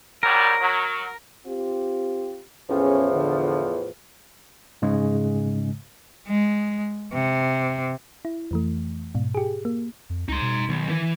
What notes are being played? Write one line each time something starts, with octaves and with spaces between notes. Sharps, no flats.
G#2 F#3 G3 A#4
F#3
C4 F4 G4
E2 A2 F3 C#4 G#4
D3
G#2 C#3 G#3
G#3
C3
E4
F2 E3 A3
G#2 B2
G4 G#4
A#3
F2
C#2 D#4 C6
B2
B1 D#3
E3